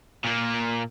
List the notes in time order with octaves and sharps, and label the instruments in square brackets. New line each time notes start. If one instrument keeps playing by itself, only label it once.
[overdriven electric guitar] A#2 A#3